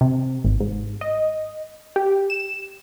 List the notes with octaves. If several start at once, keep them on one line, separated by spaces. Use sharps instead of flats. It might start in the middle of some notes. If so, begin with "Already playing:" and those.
C3
G#1
G#2
D#5
G4
E7